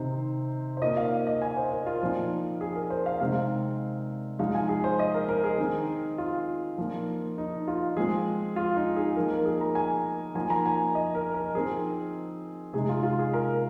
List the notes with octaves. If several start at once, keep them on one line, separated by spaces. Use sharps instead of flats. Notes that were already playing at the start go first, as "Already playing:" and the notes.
Already playing: C3 D#3 C4 D#4 C5
C5
A#2 A#3 D#4 D#5
F5
D#5
G#5
C5
A#4
F4
A#2 F3 C4 D#4
G#4
A#4
C5
F5
C3 G#3 C4 D#4 F5
F3 G#3 D#4 F5
G#5
G#4
C5
D#5
A#4
A#4
G#4
D#3 C4 D#4
F4
A#2 F3 A#3 D#4
D#4
F4
F3 G#3 C4 G#4
F4
D#4
G#4
F3 A#3 D#4 A#4
A#4
G#4
A#5
G#5
F3 A#3 D#4 G#5
A#5
G#5
D#5
A#4
A#4
F3 C4 D#4 G#4
C3 G#3 D#4 G#4
F4
F4
G#4
A#4